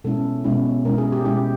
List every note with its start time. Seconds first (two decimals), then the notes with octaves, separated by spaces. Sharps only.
0.04 B2 G#3 C#4 E4 A4
0.44 B2 G#3 C#4 E4
0.85 B2 G#3 C#4 E4 A#4
0.98 G#4
1.12 G4
1.25 B2 G#3 C#4 E4 G4